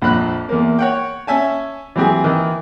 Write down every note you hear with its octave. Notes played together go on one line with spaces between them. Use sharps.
A#1 F2 B5 F#6
E2 A#3
C#5 F#5 G5
C#4 E5 G#5 A5
E3 F#3 C4 G4 G#4
D#3 E3